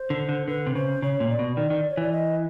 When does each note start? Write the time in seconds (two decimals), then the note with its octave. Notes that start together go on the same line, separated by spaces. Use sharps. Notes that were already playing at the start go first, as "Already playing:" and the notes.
Already playing: C5
0.10 D3
0.29 D3
0.47 D3 B4
0.66 C3
0.75 C#3 C5
1.02 C#3 C#5
1.20 A#2
1.29 D5
1.39 B2
1.57 D#3 D5
1.70 D#3
1.90 C#5
1.97 E3 D5
2.12 D#5